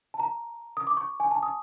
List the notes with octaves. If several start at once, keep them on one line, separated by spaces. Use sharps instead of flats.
A5
A#5
D#6
D6
C#6
G#5
A5
D#6